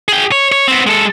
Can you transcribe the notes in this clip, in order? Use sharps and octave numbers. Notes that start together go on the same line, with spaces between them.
G#4 G5
C#5
C#5
B3 C4
G#3 A4